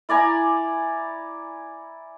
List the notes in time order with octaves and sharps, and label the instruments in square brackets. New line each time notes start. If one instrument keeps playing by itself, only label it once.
[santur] E4 D5 G#5 A#5